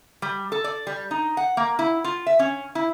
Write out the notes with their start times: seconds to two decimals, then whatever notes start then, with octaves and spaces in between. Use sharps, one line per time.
0.22 G3
0.52 A4
0.64 D5
0.87 G3
1.11 D#4
1.37 F#5
1.57 A#3
1.79 E4
2.04 F4
2.27 E5
2.39 C#4
2.75 E4